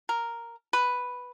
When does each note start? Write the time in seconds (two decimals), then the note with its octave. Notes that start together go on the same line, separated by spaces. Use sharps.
0.09 A#4
0.73 B4